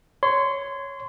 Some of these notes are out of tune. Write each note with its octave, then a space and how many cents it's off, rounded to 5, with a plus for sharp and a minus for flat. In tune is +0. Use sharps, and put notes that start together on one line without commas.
C#5 +0 C6 -25